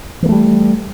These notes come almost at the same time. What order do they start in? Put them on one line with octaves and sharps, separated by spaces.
E3 A#3 A3 G3